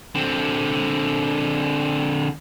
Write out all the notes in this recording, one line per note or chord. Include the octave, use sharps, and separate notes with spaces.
D3 C4